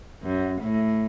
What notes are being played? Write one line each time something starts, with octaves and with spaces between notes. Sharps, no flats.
F#2
A2